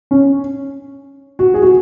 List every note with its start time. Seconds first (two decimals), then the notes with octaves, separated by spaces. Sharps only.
0.11 C#4
1.39 F#4
1.54 G#4
1.63 F#4